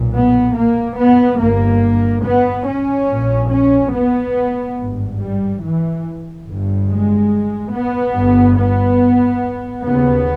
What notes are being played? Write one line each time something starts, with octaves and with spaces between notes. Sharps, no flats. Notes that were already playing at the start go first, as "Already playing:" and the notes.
Already playing: B1 A#2
B3
A#3
B3
G1 G2 A#3
B3
C#4
A#1 A#2
C#4
B3
G#1 G2
G3
E3
G1 G2
G#3
B3
G1 G2
B3
D#2 C#3 B3